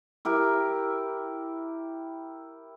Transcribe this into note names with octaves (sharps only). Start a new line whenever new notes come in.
E4 G4 A#4